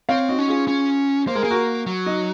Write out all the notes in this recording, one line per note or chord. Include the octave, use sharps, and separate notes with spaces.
C4 C#5 F5
D#4 F#4
C#4
F4 G#4
C#4
A#3 C5
G#3 A#4
A#3 G#4
F#4 A#4
F#3
D#4